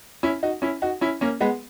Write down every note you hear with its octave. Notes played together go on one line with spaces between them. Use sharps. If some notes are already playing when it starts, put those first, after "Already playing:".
C#4 E4
D#4 F#4
C#4 E4
D#4 F#4
C#4 E4
A#3 C#4
G#3 B3